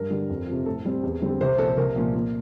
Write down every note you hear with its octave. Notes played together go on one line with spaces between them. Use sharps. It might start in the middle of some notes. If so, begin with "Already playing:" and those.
Already playing: G2 A#4
D3 G3
F2
C3 F3
A2 A4
G3 C4
E2
D3 G3 C4
C2 C5
A#2 F3 A#3 A4
C2 A#4
A#2 F3
A#2